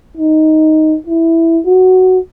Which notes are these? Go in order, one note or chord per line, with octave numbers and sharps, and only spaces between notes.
D#4
E4
F#4